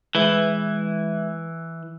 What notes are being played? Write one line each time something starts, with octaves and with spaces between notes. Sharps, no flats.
E3 G#3 B4 E5